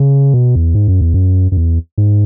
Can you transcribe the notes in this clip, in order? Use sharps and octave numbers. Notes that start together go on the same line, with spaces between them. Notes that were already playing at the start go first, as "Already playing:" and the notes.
Already playing: C#3
B2
E2
G#2
F#2
E2
F#2
F#2
E2
G#2